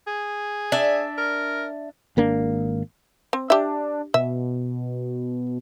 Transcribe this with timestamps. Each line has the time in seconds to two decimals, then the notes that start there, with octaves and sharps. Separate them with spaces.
0.07 G#4
0.72 D4 E5
1.18 A#4
2.17 G#1 A#3 D4
3.33 C4
3.50 D4 G4 E5
4.14 B2 E5